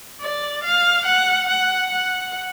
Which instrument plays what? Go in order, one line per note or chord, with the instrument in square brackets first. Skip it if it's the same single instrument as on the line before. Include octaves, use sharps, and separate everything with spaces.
[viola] D5
F5
F#5
F#5
F#5